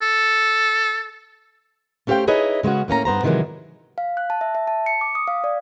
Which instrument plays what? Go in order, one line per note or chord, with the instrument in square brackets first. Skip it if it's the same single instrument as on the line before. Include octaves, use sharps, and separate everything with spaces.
[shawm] A4
[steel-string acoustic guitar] A3 C#4 G4 C5 F5 G5
D#4 E4 G#4 B4 C#5 D#5
C#3 G#3 B3 C#4 F#4
A2 A#3 C#4 A#5
G2 B3 C5 A#5
C3 D#3 E3 F#3 G#3
[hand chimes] F5
F#6
A5
E5
E5
A5
C#7
D6
D#6
F5
D5